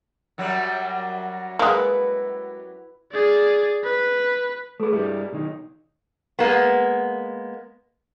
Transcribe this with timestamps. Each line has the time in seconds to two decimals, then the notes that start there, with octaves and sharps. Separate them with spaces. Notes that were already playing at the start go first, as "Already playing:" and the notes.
0.38 F#2 F#3 G3
1.59 G#3 A#3 E4 B4 F#5
3.12 G#4 D5
3.84 B4
4.80 A3 G#4 A4 B4
4.93 G2 G3 E4 B4
5.32 B1 D#3 D#4
6.39 G#3 A#3 B3